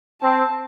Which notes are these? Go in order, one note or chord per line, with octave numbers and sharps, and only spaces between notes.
C4 A5